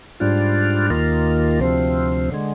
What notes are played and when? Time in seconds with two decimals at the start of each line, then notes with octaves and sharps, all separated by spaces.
0.20 G#2 G3 D4 F4
0.90 D#2 D#3 A#3 F4
1.60 D2 C3 F3 C4
2.32 D3 G#3